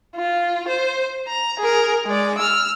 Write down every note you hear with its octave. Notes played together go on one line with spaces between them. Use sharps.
F4
C5
A#5
G#4 A#4
G#3 D5
E6 F6